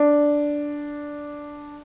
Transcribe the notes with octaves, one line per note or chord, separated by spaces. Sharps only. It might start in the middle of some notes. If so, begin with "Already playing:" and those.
Already playing: D4